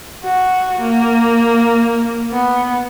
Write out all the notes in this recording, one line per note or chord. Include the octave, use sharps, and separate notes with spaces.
F#4
A#3
B3